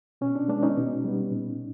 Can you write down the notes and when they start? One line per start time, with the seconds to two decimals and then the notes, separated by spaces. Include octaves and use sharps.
0.21 B2 C#4
0.35 D4
0.48 G#3 B3 D4
0.63 C#4 D#4
0.77 B2
1.04 G3 B3
1.31 A#2